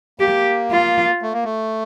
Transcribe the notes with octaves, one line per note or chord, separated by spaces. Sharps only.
A#3 G4
F4
A3
A#3
A3